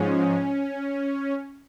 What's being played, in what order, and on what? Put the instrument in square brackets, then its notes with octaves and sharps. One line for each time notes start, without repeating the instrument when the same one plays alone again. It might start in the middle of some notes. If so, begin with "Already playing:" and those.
Already playing: [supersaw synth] G#2 F3 G#3 C#4